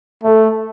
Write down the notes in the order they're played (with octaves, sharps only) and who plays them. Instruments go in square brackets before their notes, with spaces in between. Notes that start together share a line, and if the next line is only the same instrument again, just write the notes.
[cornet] A3 [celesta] A4 E5